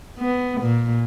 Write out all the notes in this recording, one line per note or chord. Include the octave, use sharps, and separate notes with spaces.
B3
A#2